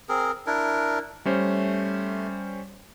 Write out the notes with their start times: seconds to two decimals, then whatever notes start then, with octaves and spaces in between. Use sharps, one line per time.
0.09 C4 G#4 A#4
0.46 D4 E4 A#4
1.25 G3 A3 C#4 C5